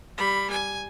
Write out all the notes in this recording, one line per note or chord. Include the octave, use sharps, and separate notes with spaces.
G3 B5
G#5